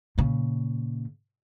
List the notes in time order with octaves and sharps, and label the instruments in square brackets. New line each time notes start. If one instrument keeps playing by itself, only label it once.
[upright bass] A#2 C#3